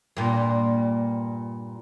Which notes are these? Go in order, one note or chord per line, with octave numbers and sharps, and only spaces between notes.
G2 A#2